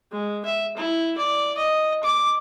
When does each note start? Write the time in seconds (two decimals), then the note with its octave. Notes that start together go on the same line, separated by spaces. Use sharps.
0.12 G#3
0.45 E5
0.77 E4
1.17 D5
1.57 D#5
2.03 D6